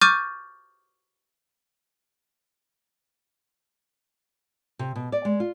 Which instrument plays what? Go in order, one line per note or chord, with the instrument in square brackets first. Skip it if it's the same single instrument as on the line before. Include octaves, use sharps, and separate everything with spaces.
[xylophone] C#6 D6 F6 G6 A6 D#7
[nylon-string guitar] C3
B2
D5
G#3
F4